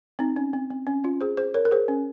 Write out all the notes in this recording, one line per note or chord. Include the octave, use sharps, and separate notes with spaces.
C4 D#4
C#4
C4
C4
C#4
C#4 F4
G#4 C5
G#4 C5
A#4 C#5
A#4
G#4 C5
C#4